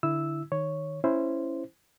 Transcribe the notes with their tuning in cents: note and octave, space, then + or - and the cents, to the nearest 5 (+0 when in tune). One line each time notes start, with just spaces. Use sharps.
D3 +0 E4 +0 E6 -5
D#3 +0 C#5 +0
C#4 -5 E4 +5 C5 -5